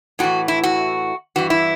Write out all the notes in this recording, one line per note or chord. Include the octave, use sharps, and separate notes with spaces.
A2 E3 F#4
E4
F#4
G2 E3 F#4
E4